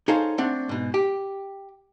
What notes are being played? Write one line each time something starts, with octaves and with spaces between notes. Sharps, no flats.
D#4 G#4 A4 C5 C#5 F5
A3 C4 D4 F#5
G#2 B2
G4